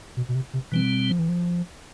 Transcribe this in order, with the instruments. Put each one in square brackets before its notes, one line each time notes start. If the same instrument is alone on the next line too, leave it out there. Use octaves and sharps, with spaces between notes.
[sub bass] B2
B2
C3
C3
[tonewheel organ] B2 G3 C4 [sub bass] E3
[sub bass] F3
E3
F3